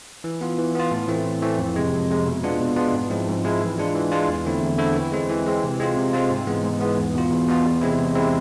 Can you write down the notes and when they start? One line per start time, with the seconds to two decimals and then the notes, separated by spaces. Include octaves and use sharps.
0.24 E3
0.41 B3 F4
0.58 E3
0.75 B3 F4
0.91 A2
1.08 E3 A3 C4
1.26 A2
1.42 E3 A3 C4
1.59 F2
1.76 C3 G#3
1.93 F2
2.10 C3 G#3
2.26 B2
2.43 G#3 B3 D4 F4
2.60 B2
2.76 G#3 B3 D4 F4
2.93 G#2
3.10 F3 G#3 C4 E4
3.27 G#2
3.44 F3 G#3 C4 E4
3.61 E3
3.78 G#3 D4 F4
3.95 E3
4.12 G#3 D4 F4
4.28 E2
4.45 D3 A3 C4 E4
4.61 E2
4.78 D3 A3 C4 E4
4.96 E3
5.12 G#3 C4
5.29 E3
5.46 G#3 C4
5.63 C3
5.80 G#3 C4 F4
5.96 C3
6.13 G#3 C4 F4
6.30 G#2
6.47 E3 G#3 B3
6.64 G#2
6.81 E3 G#3 B3
6.97 E2
7.15 B2 B3 F4
7.31 E2
7.48 B2 B3 F4
7.65 E2
7.81 C3 G#3 C4 E4
7.98 E2
8.15 C3 G#3 C4 E4